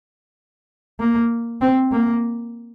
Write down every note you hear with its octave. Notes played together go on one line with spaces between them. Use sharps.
A#3
C4
A#3